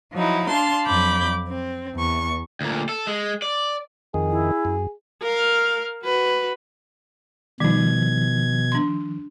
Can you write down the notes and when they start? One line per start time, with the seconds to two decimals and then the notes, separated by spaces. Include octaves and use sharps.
0.13 F3 F#3 D#4 E4
0.49 D4 F5 A5 C6
0.86 F2 F#3 B5 D6 G6
1.48 C4
1.95 E2 C#6
2.61 D2 A#2
2.89 A4
3.07 G#3
3.42 D5
4.14 F2 D#3 G#4
4.30 E4
4.65 F#2
5.22 A#4 F5
6.04 F#4 B4
7.60 B2 D#3 F3 G3 D#4 G#6
8.72 D4 C6